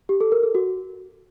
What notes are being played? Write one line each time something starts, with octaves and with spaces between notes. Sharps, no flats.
G4
A4
A#4
A4
F#4